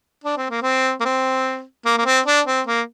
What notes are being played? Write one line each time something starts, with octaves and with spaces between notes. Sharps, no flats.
D4
C4
A#3
C4
A#3
C4
A#3
A#3
C4
D4
C4
A#3